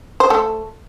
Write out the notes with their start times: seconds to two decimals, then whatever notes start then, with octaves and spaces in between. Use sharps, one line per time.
0.20 C5
0.30 A3 A4